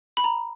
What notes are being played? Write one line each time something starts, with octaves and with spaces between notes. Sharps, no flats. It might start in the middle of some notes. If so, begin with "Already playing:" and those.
B5
A#5